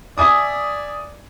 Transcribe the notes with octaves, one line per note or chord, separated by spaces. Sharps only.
D5 E5 G#5 D#6